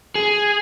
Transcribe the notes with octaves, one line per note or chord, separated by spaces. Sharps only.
G#4